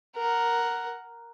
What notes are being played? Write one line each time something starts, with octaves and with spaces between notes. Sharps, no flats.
A#4 F#5